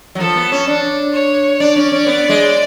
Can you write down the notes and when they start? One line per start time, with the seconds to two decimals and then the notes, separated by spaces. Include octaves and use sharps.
0.15 F#3
0.20 F3 A4
0.36 B3
0.52 C#4
0.67 D4
1.13 C#5
1.60 D4 D5
1.76 C#4
1.92 C#4
2.06 B3
2.29 G#3